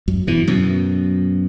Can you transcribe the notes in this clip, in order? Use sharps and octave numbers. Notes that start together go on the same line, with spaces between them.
F#2
B2 E3
F#2 B2